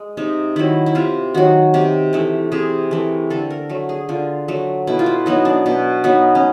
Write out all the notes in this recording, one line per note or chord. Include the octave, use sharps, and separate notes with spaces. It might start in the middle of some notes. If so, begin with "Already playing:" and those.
Already playing: G#3
C3 D#4
D#3 F#3 E4
E4
C3 F4
D#3 F#3 F#4
C3 G4
E3 A3
C3 G#4
E3 A3
D3 A4
A#4
F#3 A3
G#4
D3 F4
F#3 A3
B2 E4
F4
E4
F#3 B3 D#4
D4
B2
F#3 B3 D#4
C#4